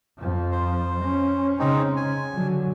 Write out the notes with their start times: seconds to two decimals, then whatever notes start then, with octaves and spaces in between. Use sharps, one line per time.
0.19 F2 F3
0.52 C5
1.03 C#4
1.59 C#3 G#3 C4 D#4
1.97 G#5
2.33 D3 F#3